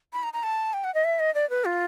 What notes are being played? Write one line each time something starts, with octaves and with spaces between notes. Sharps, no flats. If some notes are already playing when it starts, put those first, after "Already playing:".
B5
A#5
A#5
A5
G5
F#5
D#5
E5
D#5
D5
B4
F4